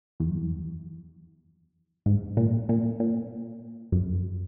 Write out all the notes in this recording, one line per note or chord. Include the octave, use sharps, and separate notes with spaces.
E2
F#2
E2
G#2
A#2
A#2
A#2
F#2